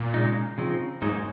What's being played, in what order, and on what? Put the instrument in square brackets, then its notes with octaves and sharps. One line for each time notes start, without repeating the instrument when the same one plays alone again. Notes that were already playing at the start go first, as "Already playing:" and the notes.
Already playing: [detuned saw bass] A#2
[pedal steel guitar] C#3 G#3 D#4
C#3 F3 C4 D#4
[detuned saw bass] G#2 [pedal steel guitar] F#3 A#3 D#4 G#4 C5